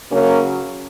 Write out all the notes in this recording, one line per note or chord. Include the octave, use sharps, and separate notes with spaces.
C#3 F#3 A#3 C#4